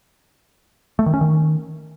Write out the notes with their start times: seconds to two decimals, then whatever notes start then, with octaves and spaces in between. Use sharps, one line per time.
0.99 A3
1.06 D#3
1.14 C#4
1.21 D#3